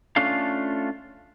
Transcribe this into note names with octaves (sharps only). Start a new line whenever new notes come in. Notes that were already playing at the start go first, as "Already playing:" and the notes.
A3 C#4 D4 F4 A4 F5